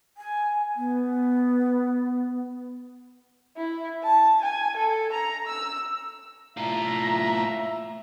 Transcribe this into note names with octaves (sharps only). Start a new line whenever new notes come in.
G#5
B3
E4
A5
G#5
A4
A#5
E6
A2 F4 E5 A#5